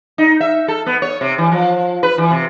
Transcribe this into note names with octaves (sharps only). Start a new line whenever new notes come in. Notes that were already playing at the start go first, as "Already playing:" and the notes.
D#4
E5
A4
B3
C#5
C3
E3
F3
B4
E3
C3